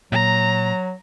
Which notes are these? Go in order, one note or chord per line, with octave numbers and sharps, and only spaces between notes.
A#2 F#3 A#5